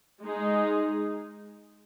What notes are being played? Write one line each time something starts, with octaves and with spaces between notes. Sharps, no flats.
G#3 D#4 G#4